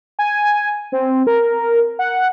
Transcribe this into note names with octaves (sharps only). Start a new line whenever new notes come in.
G#5
C4
A#4
F#5